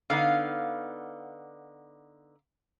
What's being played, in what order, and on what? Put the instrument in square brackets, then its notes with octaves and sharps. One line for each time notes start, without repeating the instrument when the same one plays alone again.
[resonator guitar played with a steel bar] D3 B3 D#4 [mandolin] F5